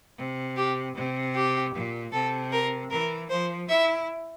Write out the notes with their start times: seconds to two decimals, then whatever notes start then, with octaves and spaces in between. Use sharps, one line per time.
0.18 C3
0.57 G4
0.95 C3
1.35 G4
1.74 A#2
2.13 C3 A4
2.52 A#4
2.91 E3 A#4
3.30 F3 C5
3.69 E4 E5